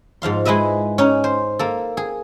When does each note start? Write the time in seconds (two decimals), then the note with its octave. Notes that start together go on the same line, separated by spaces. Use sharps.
0.22 G#2 F3 F5 C6
0.45 G#3 E4 B4 D#5 E5
0.98 C#4 D#4
1.24 C5
1.59 A#3 A4
1.97 G#4